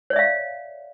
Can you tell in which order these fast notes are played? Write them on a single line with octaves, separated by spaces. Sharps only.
C#5 D5 E5 F5